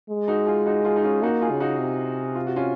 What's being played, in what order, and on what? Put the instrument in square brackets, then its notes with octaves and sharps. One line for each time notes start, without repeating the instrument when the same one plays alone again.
[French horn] G#3
[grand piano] D#4 F#4
F4 G#4
D#4 F#4
F4 G#4
D#4
C#4 F4
[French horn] A#3 [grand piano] D#4 F#4
[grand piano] F4 G#4
[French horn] C#3
[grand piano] D#4 F#4
[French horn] C3
[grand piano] F4
F#4
C#4 F4